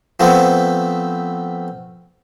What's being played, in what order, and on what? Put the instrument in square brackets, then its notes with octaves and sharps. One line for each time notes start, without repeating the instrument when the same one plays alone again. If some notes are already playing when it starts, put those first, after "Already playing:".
[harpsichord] F3 A3 B3 C4